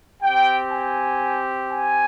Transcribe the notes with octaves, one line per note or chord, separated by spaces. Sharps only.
C4 G4 G5
G#5
G#5